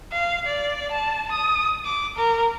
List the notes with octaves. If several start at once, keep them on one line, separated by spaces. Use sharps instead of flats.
F5
D5
A5
D#6
D6
A#4